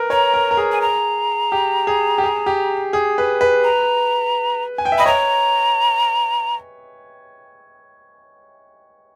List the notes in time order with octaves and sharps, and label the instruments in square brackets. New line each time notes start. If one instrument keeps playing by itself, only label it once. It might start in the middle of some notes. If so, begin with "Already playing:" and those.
Already playing: [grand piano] A#4 B4
[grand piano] C#5 [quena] A#5
[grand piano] A#4
A#4
G#4
[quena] G#5
A#5
[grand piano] G4
G#4
G4
G#4
G4
G#4
B4
B4
[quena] A#5
[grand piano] G#5
G5
E5
[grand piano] D#5 [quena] B5
[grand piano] C#5 [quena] A#5